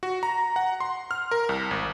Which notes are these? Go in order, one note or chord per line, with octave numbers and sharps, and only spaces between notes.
F#4
A#5
F#5
C6
F6
A#4
C2
G#1